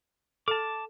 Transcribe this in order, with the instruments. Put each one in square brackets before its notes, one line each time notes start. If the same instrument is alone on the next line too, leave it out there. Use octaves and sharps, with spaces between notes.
[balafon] A4 [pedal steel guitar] A5 D6